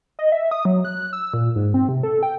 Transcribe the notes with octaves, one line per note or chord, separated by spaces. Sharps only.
D#5
E5
D#6
F#3
F#6
E6
A#2
G#2
C4
C3
A4
G5